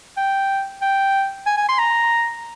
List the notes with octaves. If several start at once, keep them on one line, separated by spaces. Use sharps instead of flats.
G5
G5
G#5
G#5
C6
A#5